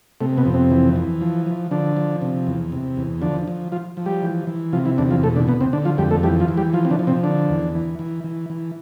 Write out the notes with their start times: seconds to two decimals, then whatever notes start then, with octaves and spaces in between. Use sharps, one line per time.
0.20 C3 A3
0.37 B2 B3
0.45 F2
0.54 C3 C4
0.71 E3
0.96 E3
1.21 F3
1.46 F3
1.71 D3 F3 D4
1.97 F3
2.22 C3
2.47 E2
2.72 C3
2.97 E2
3.22 D3 F3 D4
3.48 F3
3.72 F3 F4
3.97 F3
4.06 G3 G4
4.22 E3
4.47 E3
4.73 C3 F3 F4
4.85 E3 E4
4.98 E2 D3 D4
5.11 F3 F4
5.23 B2 A3 A4
5.35 D3 D4
5.48 B2 B3
5.61 C3 C4
5.73 D3 D4
5.85 F3 F4
5.98 F2 G3 G4
6.11 A3 A4
6.23 E3 G3 G4
6.40 F3 F4
6.48 E3
6.57 G3 G4
6.73 F3 F4
6.85 C4
6.91 D3 D4
6.99 F3
7.07 C3 C4
7.23 D3 D4
7.49 E2
7.74 E3
7.99 E3
8.24 E3
8.50 E3